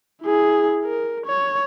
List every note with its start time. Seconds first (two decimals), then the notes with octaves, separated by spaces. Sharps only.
0.22 E4 G#4
0.85 A#4
1.26 C#5